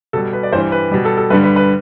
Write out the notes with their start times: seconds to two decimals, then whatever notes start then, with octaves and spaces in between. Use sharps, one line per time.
0.13 B2 G3 A4
0.33 B4
0.43 D5
0.52 G2 E3 G3 C5
0.72 B4
0.91 B2 G3
1.05 A4
1.18 A4
1.30 G2 D3 G3 B4
1.43 B4
1.56 B4